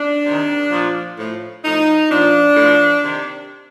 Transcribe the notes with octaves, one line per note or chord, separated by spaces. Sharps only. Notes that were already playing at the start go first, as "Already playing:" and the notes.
Already playing: D4
C3 D#3
A#2 F3
A2 F3
A2 F3 D#4
A#2 F3 D4
A2 F3
C3 D#3